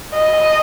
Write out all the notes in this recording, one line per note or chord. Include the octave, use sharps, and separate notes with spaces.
D#5